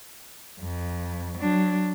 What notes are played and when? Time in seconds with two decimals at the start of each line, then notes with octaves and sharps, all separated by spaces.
0.60 F2
1.38 F#3 D4